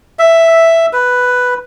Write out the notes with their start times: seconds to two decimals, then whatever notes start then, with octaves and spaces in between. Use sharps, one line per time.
0.19 E5
0.93 B4